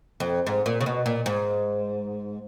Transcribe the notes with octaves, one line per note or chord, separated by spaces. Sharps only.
F2
G#2
A#2
C#3
B2
A#2
G#2